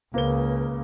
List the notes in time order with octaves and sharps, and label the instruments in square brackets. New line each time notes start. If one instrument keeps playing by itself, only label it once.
[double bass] C#2 C#3 [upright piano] A#3 B4 G7